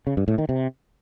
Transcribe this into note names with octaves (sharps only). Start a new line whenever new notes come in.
C#3
G2
A2
D#3
C3